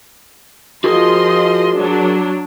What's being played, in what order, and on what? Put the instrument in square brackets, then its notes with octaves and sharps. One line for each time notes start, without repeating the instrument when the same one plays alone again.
[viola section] F3 D#5 C6 [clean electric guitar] F#4 G#4 A#4
[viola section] F#3 D4